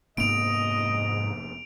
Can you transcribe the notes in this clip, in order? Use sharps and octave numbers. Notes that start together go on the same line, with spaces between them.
F1 G#2 A#3 B3 D#5 D7 F7